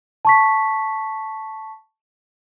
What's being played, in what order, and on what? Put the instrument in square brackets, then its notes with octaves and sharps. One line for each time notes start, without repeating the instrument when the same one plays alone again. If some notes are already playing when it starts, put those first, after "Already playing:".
[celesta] A5 C#6 B6